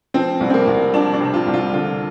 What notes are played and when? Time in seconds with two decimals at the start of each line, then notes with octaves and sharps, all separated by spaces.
0.14 F3 C4
0.41 C2
0.50 C4
0.54 A#3
0.67 C2
0.93 F3 D4
1.14 D4
1.20 C3
1.34 F4
1.47 C2
1.54 F4
1.73 D3 F4